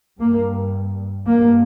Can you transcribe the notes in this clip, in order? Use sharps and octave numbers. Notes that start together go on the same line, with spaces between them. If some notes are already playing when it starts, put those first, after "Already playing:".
G2 A#3
G2 A#3